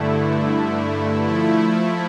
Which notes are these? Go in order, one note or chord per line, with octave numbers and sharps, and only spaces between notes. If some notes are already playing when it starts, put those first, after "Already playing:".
Already playing: G2 D3 A3 E4
F3 A3 E4